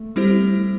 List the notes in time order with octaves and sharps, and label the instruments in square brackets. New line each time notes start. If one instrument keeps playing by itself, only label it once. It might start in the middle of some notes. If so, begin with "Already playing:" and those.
Already playing: [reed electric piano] A3
[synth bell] G3 C4 E4 G4 C5